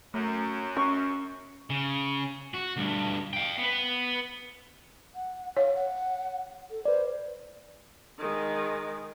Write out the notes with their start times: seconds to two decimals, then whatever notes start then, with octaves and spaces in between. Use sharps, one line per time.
0.14 F#2 A3
0.77 C#4 C#6
1.70 C#3
2.54 F#4
2.77 D2 G2
3.33 F5 G5
3.58 B3 B4
5.15 F#5
5.57 C#5 F5
5.75 F#5
6.71 A4
6.85 B4 C5 D5
8.19 D#3 G#3